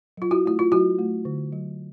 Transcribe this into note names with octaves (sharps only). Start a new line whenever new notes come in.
F#3 F4
E4 F#4
A3 E4
F4
F#3 E4 F#4
A3
D3
F#3